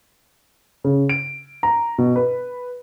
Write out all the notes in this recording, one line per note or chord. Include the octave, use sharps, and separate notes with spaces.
C#3
D7
A#5
B2
B4